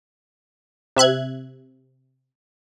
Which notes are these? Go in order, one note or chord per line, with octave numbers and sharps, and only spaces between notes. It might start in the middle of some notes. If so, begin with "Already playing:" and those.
C3 E5 F#6 G#6